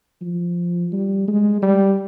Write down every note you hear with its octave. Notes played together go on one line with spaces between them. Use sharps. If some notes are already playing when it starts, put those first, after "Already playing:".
F3
G3
G#3
G3